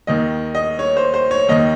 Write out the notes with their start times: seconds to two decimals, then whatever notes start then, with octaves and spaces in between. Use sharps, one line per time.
0.07 D#2 D#3 D#5
0.55 D#5
0.79 C#5
0.97 C5
1.14 C5
1.31 C#5
1.49 D#2 D#3 D#5